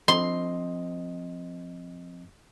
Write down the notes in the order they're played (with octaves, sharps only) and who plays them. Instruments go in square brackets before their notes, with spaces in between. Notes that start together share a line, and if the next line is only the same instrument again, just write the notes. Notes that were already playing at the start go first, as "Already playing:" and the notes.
[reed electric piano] F3 C4 D#5 [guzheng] C6